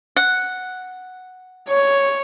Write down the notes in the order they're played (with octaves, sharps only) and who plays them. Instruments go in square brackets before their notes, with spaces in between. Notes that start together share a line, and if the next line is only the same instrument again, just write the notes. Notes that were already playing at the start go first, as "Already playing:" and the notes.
[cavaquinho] F#5
[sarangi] C#5